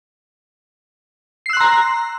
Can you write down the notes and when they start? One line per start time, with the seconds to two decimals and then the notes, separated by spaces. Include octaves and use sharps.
1.46 C7
1.49 E6
1.53 F#6
1.57 C6
1.61 A#5